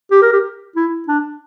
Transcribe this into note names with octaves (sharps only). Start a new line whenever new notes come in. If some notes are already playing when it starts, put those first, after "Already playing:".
G4
A#4
G4
E4
D4